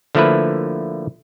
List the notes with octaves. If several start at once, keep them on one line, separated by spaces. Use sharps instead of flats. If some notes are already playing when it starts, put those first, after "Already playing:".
D3 F3 A3 A#3 E4 B4